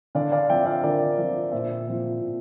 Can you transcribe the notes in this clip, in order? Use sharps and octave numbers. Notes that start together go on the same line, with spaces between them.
D3 D5 F5
D5 F5
F3 C4 E5 G5
D5 F5
D3 A#4 D5
F3 C4
A#2 C5 E5
F3 C4
A#2